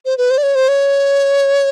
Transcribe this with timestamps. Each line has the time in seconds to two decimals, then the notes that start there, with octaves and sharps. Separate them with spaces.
0.06 C5
0.18 B4
0.31 C5
0.38 D5
0.43 C#5
0.55 C5
0.68 C#5